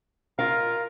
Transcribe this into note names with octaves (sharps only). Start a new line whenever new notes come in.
F4 A#4 D#5 F5